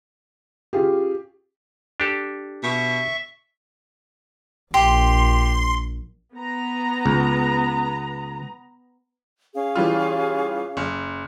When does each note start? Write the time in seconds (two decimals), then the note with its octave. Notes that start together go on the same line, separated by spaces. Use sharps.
0.73 C#4 F4 G4 G#4
2.00 D4 G4 A4
2.63 B2 E5 C#6
4.74 A#1 G4 C6
6.35 B3 A#5
7.06 C#2
9.55 C#4 G#4 F5
9.75 E3 G3 F4
10.77 F#1